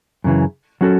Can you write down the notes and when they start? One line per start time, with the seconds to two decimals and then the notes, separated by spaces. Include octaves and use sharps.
0.24 F#2 C#3 E3
0.81 F#3 C#4 F#4 A4